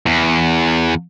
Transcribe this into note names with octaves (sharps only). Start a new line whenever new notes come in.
E2